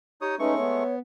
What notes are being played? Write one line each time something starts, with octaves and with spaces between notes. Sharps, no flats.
D#4 G4 C#5 D#6
G#3 A3 C#4 D#4 B4 C#6
B3 C#5